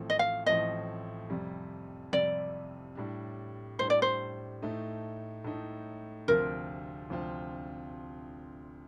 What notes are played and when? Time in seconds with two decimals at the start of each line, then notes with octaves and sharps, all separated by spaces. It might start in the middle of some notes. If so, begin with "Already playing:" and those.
Already playing: A1 A2 F3 A3 C4
0.10 D#5
0.19 F5
0.46 A1 A2 F3 A3 C4 D#5
1.30 F2 C3 G3
2.13 F2 C3 G3 D5
2.95 A2 G3 D4
3.79 A2 G3 D4 C5
3.90 D5
4.02 C5
4.62 A2 A3 D#4
5.44 A2 A3 D#4
6.28 D2 C3 F3 C4 F4 A#4
7.10 D2 C3 F3 C4 F4